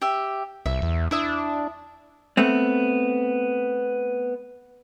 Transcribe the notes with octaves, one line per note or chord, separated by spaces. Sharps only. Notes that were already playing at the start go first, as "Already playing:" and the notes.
G4 E5
C2 E5
E2
D4 E4 E5 D#6
A3 B3 C4